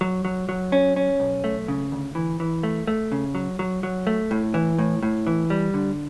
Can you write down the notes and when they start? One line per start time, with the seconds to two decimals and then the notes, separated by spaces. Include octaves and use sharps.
0.01 F#3
0.25 F#3
0.49 F#3
0.72 C#4
0.96 C#4
1.20 B1
1.44 A3
1.68 C#3
1.92 D2
2.15 E3
2.40 E3
2.63 A3
2.87 A3
3.12 C#3
3.35 F#3
3.59 F#3
3.83 F#3
4.07 A3
4.31 A2
4.54 E3
4.79 A2
5.03 A2
5.27 E3
5.50 G3
5.74 D3